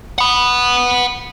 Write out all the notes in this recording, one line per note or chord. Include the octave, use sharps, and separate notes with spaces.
F#5 B5